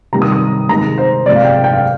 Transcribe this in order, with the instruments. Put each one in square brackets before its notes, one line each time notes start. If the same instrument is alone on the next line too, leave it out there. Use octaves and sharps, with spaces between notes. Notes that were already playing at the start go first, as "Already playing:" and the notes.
[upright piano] C3 D#3 G3 A#5
D#6
D#6
C3 D#3 G#3 A#5
C5
C3 F3 G#3 D5
F5
G5
G5
F5